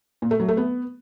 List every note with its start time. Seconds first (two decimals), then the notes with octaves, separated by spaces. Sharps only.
0.22 A#2
0.31 A3
0.40 F#3
0.48 A3
0.57 B3